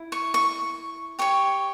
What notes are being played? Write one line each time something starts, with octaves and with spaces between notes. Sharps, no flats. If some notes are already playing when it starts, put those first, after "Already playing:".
Already playing: E4
C#6
C#6
G4 C#5 C#6